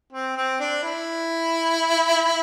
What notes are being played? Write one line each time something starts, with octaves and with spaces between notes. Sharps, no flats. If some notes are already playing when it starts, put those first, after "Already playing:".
C4
C4
D4
E4